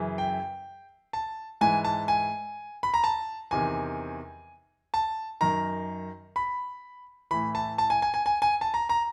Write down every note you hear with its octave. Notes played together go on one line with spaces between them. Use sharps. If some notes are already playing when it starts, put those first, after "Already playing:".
Already playing: F#2 C#3 E3
G5
A5
G#2 E3 G#5
A5
G#5
B5
A#5
A5
E2 C3 D#3 G#5
A5
F#2 D#3 A#5
B5
A2 E3 B5
A5
A5
G#5
G#5
G#5
G#5
G#5
A5
A#5
A#5